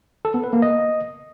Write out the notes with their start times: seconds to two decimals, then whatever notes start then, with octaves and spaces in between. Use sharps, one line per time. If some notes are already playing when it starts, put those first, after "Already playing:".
0.25 A4
0.34 B3
0.44 B4
0.53 A#3
0.62 D#5